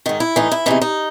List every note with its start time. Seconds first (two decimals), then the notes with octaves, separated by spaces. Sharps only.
0.06 G#2 D#3 D#4
0.20 E4
0.36 A2 E3 D#4
0.52 E4
0.66 E2 C3 E3 D#4
0.81 D#4